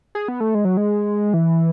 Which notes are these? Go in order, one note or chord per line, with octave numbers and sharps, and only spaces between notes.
G#4
B3
A3
G#3
F#3
G#3
E3